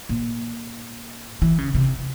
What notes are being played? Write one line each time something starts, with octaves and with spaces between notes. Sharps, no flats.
A#2
E3
C#3
C3